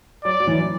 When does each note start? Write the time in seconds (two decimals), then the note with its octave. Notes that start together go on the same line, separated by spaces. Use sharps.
0.24 F#3 D5
0.40 F#3
0.47 E3